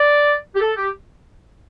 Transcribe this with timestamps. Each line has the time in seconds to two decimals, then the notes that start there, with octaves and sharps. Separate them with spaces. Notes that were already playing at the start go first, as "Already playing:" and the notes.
Already playing: D5
0.55 G4
0.61 A4
0.76 G4